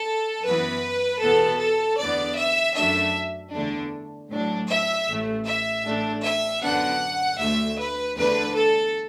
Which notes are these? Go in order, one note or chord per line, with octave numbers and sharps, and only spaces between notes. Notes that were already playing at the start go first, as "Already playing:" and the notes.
Already playing: A4
F#2 E3 B3 B4
E2 B2 B3 A4
A4
E2 D3 B3 D5
E5
F#2 F#3 A3 D4 E5
E2 D3 A3 D4
A2 F#3 D4
E5
A1 A2 A3
E5
A1 A2 A3 D4
E5
F#2 D3 B3 D4 F#5
D2 D3 A3 E5
B4
E2 D3 A3 D4 B4
A4